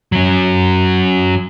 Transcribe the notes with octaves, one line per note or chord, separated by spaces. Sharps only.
F#3 C#4